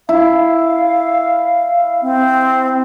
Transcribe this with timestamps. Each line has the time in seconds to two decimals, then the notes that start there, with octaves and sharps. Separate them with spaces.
0.09 E4 F5
2.02 C4